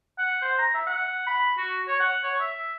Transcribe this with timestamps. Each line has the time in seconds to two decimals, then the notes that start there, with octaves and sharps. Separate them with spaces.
0.18 F#5
0.42 C5
0.58 A#5
0.74 E5
0.87 F#5
1.27 B5
1.58 F#4
1.88 C#5
2.00 F#5
2.23 C#5
2.40 E5